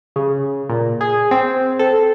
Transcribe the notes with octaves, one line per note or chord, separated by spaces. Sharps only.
C#3
A#2
G#4
C4
A4